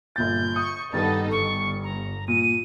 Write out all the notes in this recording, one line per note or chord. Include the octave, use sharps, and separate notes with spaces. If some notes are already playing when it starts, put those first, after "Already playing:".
G1 A#2 G6 A6
C#6 D#6
G2 D#3 G3 B3 D#4 A4 A6
G1 C#6
A#5
A#2 D#7